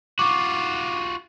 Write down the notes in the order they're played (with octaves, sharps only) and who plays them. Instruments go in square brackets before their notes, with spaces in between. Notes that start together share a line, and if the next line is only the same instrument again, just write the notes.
[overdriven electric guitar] F4 F#4 [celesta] C#6 D6